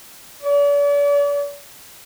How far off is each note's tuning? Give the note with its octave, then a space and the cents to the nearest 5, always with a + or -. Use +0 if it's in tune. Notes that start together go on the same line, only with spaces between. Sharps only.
D5 -45